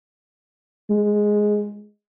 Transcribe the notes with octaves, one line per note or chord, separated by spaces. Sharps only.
G#3